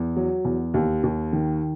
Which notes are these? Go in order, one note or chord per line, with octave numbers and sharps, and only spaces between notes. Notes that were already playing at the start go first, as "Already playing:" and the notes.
Already playing: E2
F#3
E2
D#2
D#2
D#3